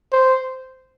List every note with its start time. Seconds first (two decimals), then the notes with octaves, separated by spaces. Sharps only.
0.13 C5